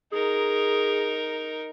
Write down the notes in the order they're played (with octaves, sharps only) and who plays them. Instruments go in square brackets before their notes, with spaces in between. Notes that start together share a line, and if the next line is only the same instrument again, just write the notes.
[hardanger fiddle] D#4 A#4 [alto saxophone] G#4